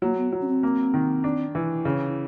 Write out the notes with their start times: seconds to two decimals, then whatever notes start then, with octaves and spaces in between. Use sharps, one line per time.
0.02 F#3 A#3
0.17 B3
0.32 F#3
0.41 C#4
0.48 C4
0.63 A#3
0.94 D#3
1.24 D4
1.55 E3
1.85 C#3 E4